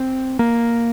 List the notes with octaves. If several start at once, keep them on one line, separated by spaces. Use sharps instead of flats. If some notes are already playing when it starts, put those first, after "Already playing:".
Already playing: C4
A#3